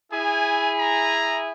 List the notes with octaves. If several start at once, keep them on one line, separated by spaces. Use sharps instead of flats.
E4 G#4 G#5
A#5